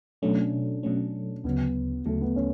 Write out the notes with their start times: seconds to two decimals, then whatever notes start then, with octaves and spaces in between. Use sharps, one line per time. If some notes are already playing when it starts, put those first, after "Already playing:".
0.22 B2 F#3 A3 C#4 D4
0.83 B2 F#3 A3 C#4
1.44 D2 C#3 F#3 B3
2.06 D2 C#3 F#3 A3
2.21 B3
2.36 C#4